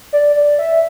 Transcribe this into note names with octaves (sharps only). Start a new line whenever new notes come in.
D5
D5
E5